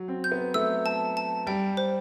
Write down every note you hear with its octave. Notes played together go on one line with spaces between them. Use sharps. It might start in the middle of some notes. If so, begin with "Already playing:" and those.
Already playing: F#3
C4
G6
B3
A3 E6
A5
A5
G3 G5
C5